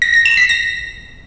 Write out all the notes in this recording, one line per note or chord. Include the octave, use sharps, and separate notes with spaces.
A#6
A#6
E7
B6
A#6